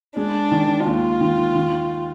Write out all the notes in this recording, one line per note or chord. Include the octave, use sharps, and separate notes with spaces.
G#3 D4
D#3
D#2 F4
D#3
D#3